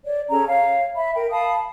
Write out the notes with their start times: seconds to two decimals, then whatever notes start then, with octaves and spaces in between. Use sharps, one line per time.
0.05 C#5 D5
0.30 C#4 G#4 A4 A#5
0.48 C#5 F5
0.97 E5 B5
1.15 A#4 G5
1.31 F5 A5 B5 D#6